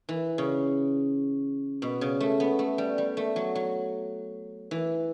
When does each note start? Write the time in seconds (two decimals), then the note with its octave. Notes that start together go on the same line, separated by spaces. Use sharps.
0.09 E3
0.38 C#3
1.82 B2
2.01 C#3
2.20 A3
2.40 B3
2.59 A3
2.78 G3
2.98 G3
3.17 A3
3.36 F#3
3.55 F#3
4.71 E3